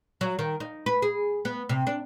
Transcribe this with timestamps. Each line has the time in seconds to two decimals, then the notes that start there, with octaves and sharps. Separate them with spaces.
0.21 F#3
0.39 D#3
0.60 D#4
0.86 B4
1.02 G#4
1.45 B3
1.69 C3
1.87 D4